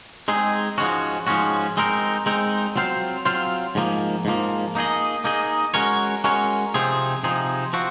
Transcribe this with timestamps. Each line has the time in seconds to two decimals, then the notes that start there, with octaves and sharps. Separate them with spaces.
0.28 G#3 C4 D#4 G#4
0.78 G#2 F3 G#3 C#4 F#4
1.27 G#2 F3 G#3 C#4 F#4
1.77 G#3 C4 D#4 A#4
2.26 G#3 C4 D#4 A#4
2.76 F#3 C4 F4 C5 F5
3.25 F#3 C4 F4 C5 F5
3.75 G#2 F3 A#3
4.25 G#2 F3 A#3
4.75 A#3 D#4 G#4 D#5
5.24 A#3 D#4 G#4 D#5
5.74 G#3 C#4 F#4 A#4 C#5
6.24 G#3 C#4 F#4 A#4 C#5
6.74 C3 F3 C4 D#4 G#4
7.24 C3 F3 C4 D#4 G#4
7.73 F3 C4 F#4